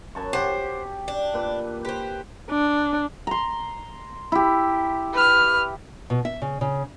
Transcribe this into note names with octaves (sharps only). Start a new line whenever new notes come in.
F#2 A5 C#6
G4 C5 F#5
D4
A#2 B4
G4 B4 C5
D4
A#5 C6
E4 G4
B4 F6
B2
E5
C#3
C#3